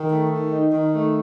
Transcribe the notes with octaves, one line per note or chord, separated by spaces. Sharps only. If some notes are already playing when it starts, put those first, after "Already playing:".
Already playing: D#3
A3
D#3
D#4
D#3
A3